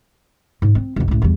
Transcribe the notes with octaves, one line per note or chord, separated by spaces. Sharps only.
G#2
C4
C2 F2
C#2 A2
E2 G3